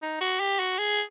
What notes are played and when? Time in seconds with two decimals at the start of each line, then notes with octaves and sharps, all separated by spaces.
0.02 D#4
0.21 F#4
0.40 G4
0.59 F#4
0.78 G#4